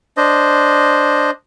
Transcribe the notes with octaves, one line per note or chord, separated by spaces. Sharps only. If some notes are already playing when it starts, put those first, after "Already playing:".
D4 C5 D#5